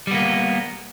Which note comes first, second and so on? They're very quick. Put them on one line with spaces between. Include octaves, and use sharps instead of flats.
G3 B3 A#3